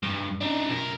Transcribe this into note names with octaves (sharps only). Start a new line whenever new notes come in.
G2
D4 D#4
B1 A#4